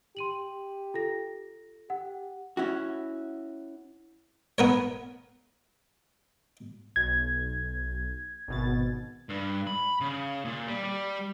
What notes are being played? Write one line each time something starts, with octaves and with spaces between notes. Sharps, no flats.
G4 C6 D#7 F#7
F4 A4 A#6
G4 F#5
C#4 E4 F#4
B3 A#4 C#5
B1 G#6
G#1 B2 A6
G2
B5
C#3
A#2
G3
G3